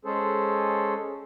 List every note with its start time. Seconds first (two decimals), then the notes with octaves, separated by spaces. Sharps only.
0.05 G#3 C#4 G#4 A4 C5